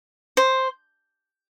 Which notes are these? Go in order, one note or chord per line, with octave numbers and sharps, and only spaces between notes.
C5